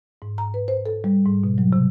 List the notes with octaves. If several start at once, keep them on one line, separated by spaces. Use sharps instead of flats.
G#2
A#5
B4
C5
A4
G3
G#2
B2
F#3
C3